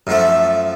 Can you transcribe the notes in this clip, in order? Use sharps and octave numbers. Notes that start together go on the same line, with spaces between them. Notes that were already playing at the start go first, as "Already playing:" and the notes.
F#2 F3 A3